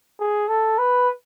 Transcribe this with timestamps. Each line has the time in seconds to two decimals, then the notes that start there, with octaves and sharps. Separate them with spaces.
0.20 G#4
0.49 A4
0.78 B4